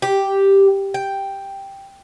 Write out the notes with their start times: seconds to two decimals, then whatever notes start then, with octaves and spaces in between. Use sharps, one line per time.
0.02 G4
0.94 G5